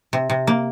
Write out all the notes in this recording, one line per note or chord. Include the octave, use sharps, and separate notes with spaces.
C3
C3
A#3